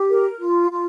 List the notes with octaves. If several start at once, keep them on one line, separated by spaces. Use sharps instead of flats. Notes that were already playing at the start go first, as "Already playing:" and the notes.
Already playing: G4
A#4
F4
F4